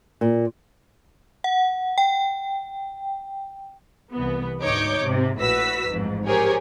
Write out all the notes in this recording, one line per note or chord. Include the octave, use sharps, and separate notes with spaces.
A#2
F#5
G5
C2 E3 B3
D2 G#2 D#4 C#5 D6 G6
G#2 C3
A#1 A2 F#4 B4 E6 B6
A1 F2 G#2
G4 G#4 A#4 C5 C#5 G#5